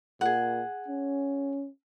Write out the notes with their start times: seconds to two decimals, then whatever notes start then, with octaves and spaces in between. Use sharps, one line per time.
0.21 A#2 G#4 F#5
0.88 C#4